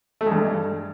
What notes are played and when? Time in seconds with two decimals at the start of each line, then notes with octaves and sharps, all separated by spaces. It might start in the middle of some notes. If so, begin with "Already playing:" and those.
0.21 A3
0.26 G#3
0.32 G2